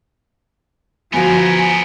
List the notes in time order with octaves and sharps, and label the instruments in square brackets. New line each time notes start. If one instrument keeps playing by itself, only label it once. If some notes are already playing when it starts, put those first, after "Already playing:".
[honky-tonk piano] G1 F#4 [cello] F3 [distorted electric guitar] B3 A#4 [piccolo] G#5